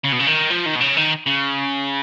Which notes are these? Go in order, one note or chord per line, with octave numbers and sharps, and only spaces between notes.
C#3
B2
C#3
D#3
F3
D#3
B2
C#3
D#3
C#3